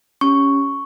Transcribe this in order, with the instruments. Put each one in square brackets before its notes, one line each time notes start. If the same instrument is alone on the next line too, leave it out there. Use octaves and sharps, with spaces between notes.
[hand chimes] C#4 G4 C#6